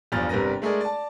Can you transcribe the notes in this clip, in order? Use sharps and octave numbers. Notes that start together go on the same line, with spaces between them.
G1 E2 G2 F3 F6 A6
G1 C3 G3 A#4 B4 A#6
G#3 A3 G#4 A#4 D5
D5 A5